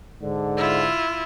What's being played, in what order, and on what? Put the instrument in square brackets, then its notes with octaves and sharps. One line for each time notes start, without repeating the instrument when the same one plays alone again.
[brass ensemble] G#2 D3
[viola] E4 F4